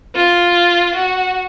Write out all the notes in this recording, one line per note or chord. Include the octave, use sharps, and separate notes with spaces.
F4
F#4